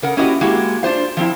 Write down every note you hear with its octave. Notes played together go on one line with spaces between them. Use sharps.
C#3 A#4 F#5
A#3 C#4 E4 F#4 G4 D#5
G#3 A#3 E4 F#4 G4
D4 F4 C5 F5
F3 C4 E4